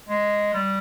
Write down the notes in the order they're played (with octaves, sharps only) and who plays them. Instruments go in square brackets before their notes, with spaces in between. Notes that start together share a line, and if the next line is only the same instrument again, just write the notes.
[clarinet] G#3
G3